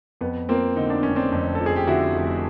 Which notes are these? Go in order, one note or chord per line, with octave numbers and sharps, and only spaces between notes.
F2 B3
F3 A#3 C4
D3 D#4
D4
F1 C#4
C4 D4
F2
A4
F3
G#4
G4
D3 E4 F#4
F1